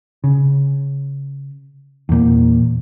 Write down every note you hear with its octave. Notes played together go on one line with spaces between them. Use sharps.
C#3
E2 A#2